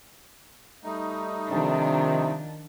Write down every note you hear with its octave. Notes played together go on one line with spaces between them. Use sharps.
G3 A3 D#4
C3 D#3 F3 D4